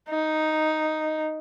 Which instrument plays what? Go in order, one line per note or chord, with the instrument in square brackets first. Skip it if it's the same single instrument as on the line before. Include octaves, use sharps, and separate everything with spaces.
[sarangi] D#4